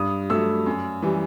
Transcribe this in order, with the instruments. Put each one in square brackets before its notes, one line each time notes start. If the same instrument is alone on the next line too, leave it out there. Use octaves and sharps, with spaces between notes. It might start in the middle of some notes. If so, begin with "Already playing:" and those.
Already playing: [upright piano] G2 D#6
F#3 A3 E6
F#2
E3 G3